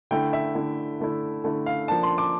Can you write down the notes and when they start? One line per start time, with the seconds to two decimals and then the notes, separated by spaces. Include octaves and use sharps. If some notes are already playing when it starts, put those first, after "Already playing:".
0.11 D3 A3 E4 G5
0.33 E5
0.55 D3 A3 E4
1.00 D3 A3 E4
1.44 D3 A3 E4
1.66 F5
1.88 F3 A#3 D4 A5
2.03 C6
2.18 D6